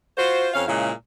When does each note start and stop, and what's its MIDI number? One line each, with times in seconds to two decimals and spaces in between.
0.17 0.48 65
0.17 0.48 66
0.17 0.48 72
0.54 0.65 41
0.54 0.65 61
0.54 0.65 77
0.67 0.91 46
0.67 0.91 49
0.67 0.91 56
0.67 0.91 64
0.67 0.91 77